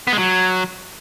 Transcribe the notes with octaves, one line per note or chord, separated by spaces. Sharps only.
B3
G#3
F#3